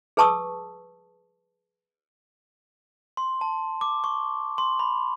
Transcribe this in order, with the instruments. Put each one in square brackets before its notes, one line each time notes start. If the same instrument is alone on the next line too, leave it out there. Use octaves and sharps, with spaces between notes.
[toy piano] G#4 B4 A5 C#6 D#6 E6
[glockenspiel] C6
A5
D6
C#6
C6
B5